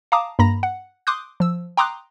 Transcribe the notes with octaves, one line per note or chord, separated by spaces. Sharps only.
F5 A5 A#5 D6 D#6
G2 A#3 A#5 B5 A#6
F#5
C6 D6 D#6 F#6 G6
F3 E6
G5 A#5 C6 D6 D#6 F#6